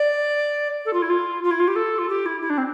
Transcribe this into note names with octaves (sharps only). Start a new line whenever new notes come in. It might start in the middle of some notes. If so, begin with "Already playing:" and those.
Already playing: D5
A4
F4
E4
F4
F4
E4
F4
G4
A4
F4
G4
E4
E4
D4
C4